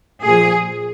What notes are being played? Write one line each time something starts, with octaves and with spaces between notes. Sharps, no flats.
A#2 F3 G#4